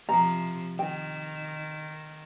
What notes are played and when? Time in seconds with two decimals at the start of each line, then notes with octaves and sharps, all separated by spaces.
0.09 C3 F3 A#5
0.79 D#3 G5